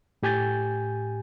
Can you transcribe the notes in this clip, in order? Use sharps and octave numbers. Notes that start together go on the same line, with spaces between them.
A2 G4 G#5 G6 A6